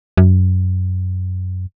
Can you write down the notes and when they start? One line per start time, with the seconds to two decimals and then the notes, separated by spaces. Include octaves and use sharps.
0.17 F#2